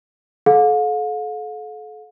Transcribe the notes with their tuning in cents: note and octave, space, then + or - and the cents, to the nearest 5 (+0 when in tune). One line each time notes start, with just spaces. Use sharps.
A4 -35 F5 +45